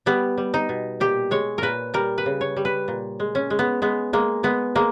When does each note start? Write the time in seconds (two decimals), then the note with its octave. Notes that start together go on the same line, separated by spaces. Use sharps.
0.06 G3 B3
0.38 G3
0.54 D#4
0.69 B2
1.00 A#2 G4
1.31 G#3 C#5
1.58 A#2 A#4 B4
1.94 G3 A#4
2.18 B4
2.26 C#3
2.41 C#5
2.56 G3
2.65 B4
2.88 A#2
3.20 G#3
3.35 C#4
3.50 G#3
3.59 B3
3.82 G#3 B3
4.13 G#3 A#3
4.43 G#3 B3
4.75 G#3 A#3